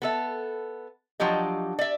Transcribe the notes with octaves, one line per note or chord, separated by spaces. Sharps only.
B3 A4 E5
F3 F#3 D4 G4 D#5
D5 E5